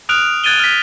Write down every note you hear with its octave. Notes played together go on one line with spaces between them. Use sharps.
D#6 F6 F#6 D7 F7
F#6 G#6 A6 D7 D#7 G7
F6 B6